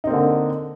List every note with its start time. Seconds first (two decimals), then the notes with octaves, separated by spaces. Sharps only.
0.04 D#4
0.07 C4
0.10 A#3
0.13 D3